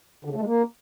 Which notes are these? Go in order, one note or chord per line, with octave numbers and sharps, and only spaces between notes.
D3
C#3
A3
G#3
A#3